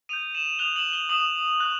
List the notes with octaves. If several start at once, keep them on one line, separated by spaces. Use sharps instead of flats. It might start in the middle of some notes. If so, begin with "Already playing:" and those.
D#6 G6 D#7 F7
E7 F#7
D#6 F#6 F7 G7
E7 F#7
F7 G7
D#6 F#6 E7 F#7
C#6 F#6